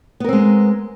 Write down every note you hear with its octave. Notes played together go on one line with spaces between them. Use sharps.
G#3 B3 C4 A#4